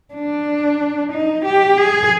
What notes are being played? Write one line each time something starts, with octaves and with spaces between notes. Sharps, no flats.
D4
D#4
G4
G#4